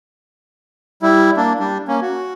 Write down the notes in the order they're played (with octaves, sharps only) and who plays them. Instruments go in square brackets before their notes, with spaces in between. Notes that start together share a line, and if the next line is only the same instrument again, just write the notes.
[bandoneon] G3 E4
A#3 D4
G3 D4
A#3 C#4
F#4